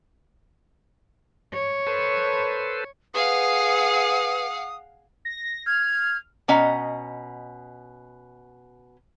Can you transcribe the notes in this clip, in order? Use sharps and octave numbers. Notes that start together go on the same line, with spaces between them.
C#5
A4 B4 C5
G#4 B4 F5 F#5 D#6
A#6
F6 G#6
B2 C#4 D#5 F#5 A#5